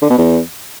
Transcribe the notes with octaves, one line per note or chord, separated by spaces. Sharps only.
D3
B2
E2